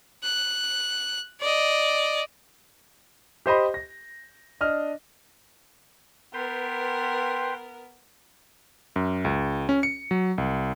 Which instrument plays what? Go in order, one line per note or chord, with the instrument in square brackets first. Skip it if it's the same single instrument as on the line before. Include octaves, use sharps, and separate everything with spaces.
[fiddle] F#6
D5 D#5
[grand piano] G4 C5 D#5 B5
A#6
D4 D#5 F6
[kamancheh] B3 A#4 [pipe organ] B4 G5 C6
[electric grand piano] F#2
C#2
C#4
C#7
F#3
C2